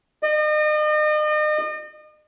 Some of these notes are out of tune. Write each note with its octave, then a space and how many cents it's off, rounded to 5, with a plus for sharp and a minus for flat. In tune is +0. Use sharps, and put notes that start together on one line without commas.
D#5 -40